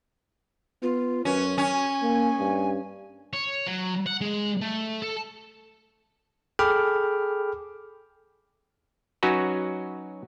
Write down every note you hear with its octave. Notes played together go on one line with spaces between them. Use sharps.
B3 F4
F#2 C#4 B4
C#4 G#5
A#3
G2
C#5
F#3
F#5
G#3
A3
A4
G#4 A4 G5 B5 D6 F6
F#3 C#4 D#4 F#4 B4